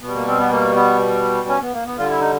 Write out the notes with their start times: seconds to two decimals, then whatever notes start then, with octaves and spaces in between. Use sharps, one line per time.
0.02 B2 G3 B3
0.15 A#3
0.27 C4
0.40 B3
0.51 A#3
0.75 B3
1.49 C#4
1.61 B3
1.73 A#3
1.86 B3
1.97 D3 G3 F4
2.10 E4
2.20 D#4